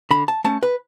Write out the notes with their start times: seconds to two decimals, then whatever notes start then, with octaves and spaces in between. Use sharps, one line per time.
0.11 D3 B5
0.28 A5
0.44 A3 C#4 A5
0.63 B4